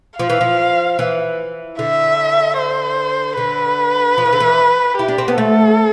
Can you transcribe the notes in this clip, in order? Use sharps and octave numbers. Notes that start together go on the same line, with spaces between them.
F3 F5
E3
F3
E3
D3 E5
C5
D3 B4
F3
E3
D3
E3
E4 G4
D4
C4
B3
A3 A4